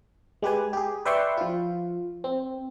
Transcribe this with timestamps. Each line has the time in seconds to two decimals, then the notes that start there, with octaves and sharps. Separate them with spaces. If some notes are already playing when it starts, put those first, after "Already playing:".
0.42 G#3 G4 B4 G#5
0.73 G4 G#4
1.05 B4 D5 E5 G5 C6 C#6
1.37 F3 F4
2.24 C4